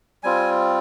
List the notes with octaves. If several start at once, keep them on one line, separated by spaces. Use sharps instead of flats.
G3 C4 F4 G#5